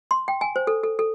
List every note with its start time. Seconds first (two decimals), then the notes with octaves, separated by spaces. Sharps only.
0.11 C6
0.28 G5
0.41 G#5
0.56 C5
0.67 A4
0.83 A4
0.99 A4